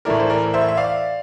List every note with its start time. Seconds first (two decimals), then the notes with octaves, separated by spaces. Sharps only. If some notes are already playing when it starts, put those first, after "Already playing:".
0.05 A2 E3 A3 E4 A#4 D5
0.20 C5
0.30 A#4 D5
0.54 C5 E5
0.68 E5
0.77 D5 F5